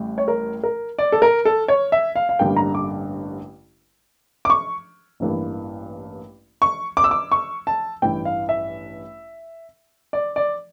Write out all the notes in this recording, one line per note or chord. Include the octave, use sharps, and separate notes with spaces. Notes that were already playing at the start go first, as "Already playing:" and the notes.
Already playing: A1 A2 G3
C#5
A#4
A#4
D5
A4
A#4
A4
C#5
E5
F5
F5
A1 G2 D3 G3 A#3 G5
A#5
D6
D6
C#6
A1 G2 E3 A#3
C#6
D6
E6
D6
C#6
A5
A1 G2 E3 G5
F5
E5
D5
D5